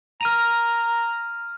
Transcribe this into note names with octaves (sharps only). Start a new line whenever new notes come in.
A#5 F6 D#7 F7